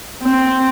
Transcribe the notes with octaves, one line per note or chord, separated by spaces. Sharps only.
C4